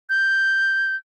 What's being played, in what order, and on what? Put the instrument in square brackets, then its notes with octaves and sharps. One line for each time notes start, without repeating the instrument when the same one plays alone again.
[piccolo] G6